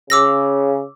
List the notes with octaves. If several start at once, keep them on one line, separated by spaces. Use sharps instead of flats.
C#3 D6 E6 A#6